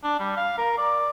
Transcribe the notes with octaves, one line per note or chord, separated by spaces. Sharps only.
D4
G3
F5
A#4
D5